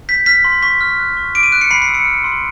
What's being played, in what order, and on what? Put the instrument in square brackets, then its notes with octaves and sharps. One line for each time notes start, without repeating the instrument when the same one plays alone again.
[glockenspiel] G6 B6
F6 B6
C6
C#6 B6
F6
F#6
C#6
D6 D7
D#7
F#6 D7
C#7
B5 C7
C7
E6
C#7
F6
C6